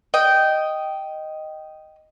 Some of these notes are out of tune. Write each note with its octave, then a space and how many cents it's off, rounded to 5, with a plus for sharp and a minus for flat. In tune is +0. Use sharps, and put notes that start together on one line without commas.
D#5 +0 G5 -10